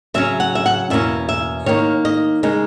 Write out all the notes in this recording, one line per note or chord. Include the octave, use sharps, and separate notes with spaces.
C#3 F#3 C#4 E5
F#5
E5
F#5
E2 B2 A#3 C#4 E5
E5
D#3 A#3 D#4 C#5
D#5
C#3 G#3 D#4